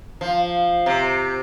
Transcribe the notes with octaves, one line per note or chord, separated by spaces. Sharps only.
F3
C3